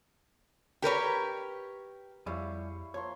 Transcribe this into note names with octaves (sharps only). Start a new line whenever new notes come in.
G4 A#4 B4 C#5
F2 G3 E4 G#4 C#5 F5
F3 A#3 C#5 C6